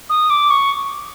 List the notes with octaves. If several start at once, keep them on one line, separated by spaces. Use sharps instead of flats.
D#6
D6
C#6